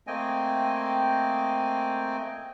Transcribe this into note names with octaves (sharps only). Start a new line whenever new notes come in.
A3 A#3 C4 D#5 G5 G#5